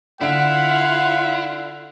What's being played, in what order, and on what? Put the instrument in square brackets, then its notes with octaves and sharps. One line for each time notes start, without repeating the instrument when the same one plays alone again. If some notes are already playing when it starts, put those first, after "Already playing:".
[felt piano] D3 D7 [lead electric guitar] E4 [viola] F4 F5 [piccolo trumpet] F#5